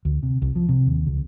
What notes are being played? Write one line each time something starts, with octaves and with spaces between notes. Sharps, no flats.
D2
C3
C2
F3
C3
D#2
C#2